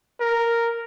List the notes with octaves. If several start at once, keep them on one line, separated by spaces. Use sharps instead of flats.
A#4